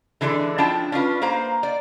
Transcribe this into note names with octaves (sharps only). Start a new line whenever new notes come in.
D3 E3 G#3 D4 G#4
F3 D4 E4 G5 A5
C#4 D4 F4 B4
A#3 C5 F5 A#5
D5